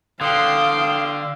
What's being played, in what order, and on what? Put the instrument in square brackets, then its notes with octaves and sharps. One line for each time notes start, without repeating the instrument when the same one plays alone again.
[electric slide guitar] D3 [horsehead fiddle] F5 [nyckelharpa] G5 C6 [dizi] D#6